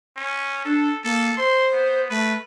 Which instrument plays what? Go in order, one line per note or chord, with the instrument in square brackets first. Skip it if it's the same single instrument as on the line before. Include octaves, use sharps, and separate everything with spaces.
[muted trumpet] C#4
[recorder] D4 [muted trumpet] A4
[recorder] A#3 [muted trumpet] A4
[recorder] C5 [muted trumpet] C6
[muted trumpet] B3
[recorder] A3 [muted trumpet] B4